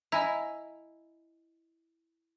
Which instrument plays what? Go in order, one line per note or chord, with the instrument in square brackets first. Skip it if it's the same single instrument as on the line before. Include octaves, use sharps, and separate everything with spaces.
[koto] E4 [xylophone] D#5 G#5 A#5